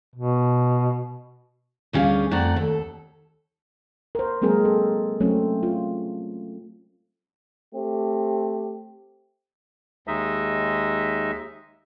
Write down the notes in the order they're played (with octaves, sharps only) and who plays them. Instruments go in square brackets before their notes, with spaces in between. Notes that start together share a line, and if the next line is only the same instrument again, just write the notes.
[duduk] B2
[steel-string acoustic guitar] D2 G3 C#4 G#4 F5
F2 A3 D5 F#5 A#5
D#2 A4
[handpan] A#4 C5
F#3 G#3 A#3 C4 G#4 A#4
A4
F#3 A3 C4 C#4
F4
[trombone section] A3 C4 G4
[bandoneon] D#2 G#3 D#4 D#5 E5